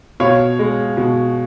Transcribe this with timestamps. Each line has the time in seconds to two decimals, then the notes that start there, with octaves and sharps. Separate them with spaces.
0.20 B2 C#5 F5
0.59 G#3
0.97 B2